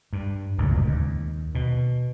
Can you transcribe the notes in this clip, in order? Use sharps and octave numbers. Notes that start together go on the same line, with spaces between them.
G2
D1 C#2 F#2 B2
D#2
B2